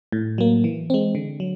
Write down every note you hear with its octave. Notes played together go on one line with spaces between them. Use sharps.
A2
F#3 A#3
E3
G#3 C4
D3
F#3